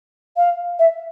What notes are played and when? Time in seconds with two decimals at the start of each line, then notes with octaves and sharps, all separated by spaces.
0.36 F5
0.79 E5